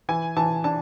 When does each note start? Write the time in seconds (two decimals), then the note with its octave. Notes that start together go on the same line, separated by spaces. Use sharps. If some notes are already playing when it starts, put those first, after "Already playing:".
0.09 E3 G#5
0.37 E3 A5
0.64 D4 A5